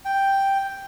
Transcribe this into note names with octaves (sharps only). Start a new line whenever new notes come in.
G5